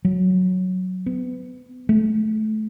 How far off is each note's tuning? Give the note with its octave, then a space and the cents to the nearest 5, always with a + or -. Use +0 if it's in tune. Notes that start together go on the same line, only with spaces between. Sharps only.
F#3 +0
B3 +30
A3 -20